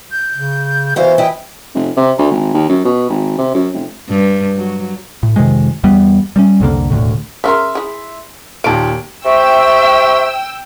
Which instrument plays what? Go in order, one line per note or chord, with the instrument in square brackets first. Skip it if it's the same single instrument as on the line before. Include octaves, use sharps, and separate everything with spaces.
[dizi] G6
[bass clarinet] C#3
[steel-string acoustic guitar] B2 E4 C5 [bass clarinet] E3 [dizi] F5
[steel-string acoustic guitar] E4 D#5 [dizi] G5
[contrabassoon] F1
C3
D2
G#1
D#2
F#2
B2
G#1
C3
F#2
F1
[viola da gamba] G2
F#3
[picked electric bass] A2
F2 C3 D#3 G#3
E2 E3 G3 B3
G3 A#3 C#4
C2 F2 D3 A#3
E1 D2 A2
[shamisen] C#3 F4 A#4 [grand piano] E5 C6
[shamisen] E4 G#4
[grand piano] D#2 A#2 D7 [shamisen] F5 A5
[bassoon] C3 [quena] E5 [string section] G5 E6 [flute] C#6